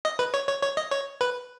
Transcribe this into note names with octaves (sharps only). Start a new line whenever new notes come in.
D#5
B4
C#5
C#5
C#5
D#5
C#5
B4